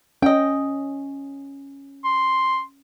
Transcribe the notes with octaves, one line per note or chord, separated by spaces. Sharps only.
C#4 D#5 G5
C6